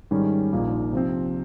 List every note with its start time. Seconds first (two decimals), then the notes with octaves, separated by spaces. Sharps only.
0.11 G#2 D#3 G3 C#4 G4
0.52 A#1 A#2 F3 A#3 D#4
0.93 C3 F3 C4